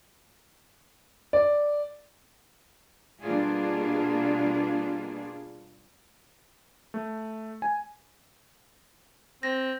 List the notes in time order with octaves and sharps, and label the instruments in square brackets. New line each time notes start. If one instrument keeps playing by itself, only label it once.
[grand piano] D5
[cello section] B2 G3 A#3 D4 F4 G#4
[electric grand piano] A3
G#5
[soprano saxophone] C4 [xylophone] A#6